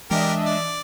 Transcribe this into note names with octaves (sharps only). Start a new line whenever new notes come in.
E3 G#3 D4 G4 A#4 D#5 E5 D7
D5